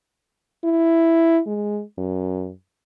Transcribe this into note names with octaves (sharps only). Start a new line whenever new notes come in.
E4
G#3
F#2